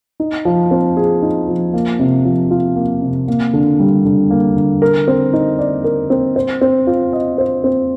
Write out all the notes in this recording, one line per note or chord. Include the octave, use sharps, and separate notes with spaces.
D#4
F3
C4
G#4
D#4
F3
A#3
C3
F3
F4
A#3
C3
A#3
D3
G3
D3
A#3
D3
A#4
C4
D#4
D5
A#4
C4
C5
C4
F4
D#5
C5
C4